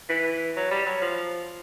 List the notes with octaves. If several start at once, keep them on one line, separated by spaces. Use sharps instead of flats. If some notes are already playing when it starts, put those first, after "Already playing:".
E3
F#3
G3
F#3
F3